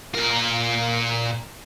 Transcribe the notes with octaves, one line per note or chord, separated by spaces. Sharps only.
A#2 A#4